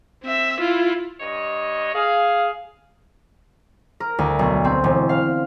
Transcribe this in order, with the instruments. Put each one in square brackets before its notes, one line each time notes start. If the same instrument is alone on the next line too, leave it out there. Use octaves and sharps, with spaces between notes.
[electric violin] C4 E5
E4 F4
[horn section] G2 C#5 D#5
G#4 F5
[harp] A#4
D2
B1
C4
E1
F5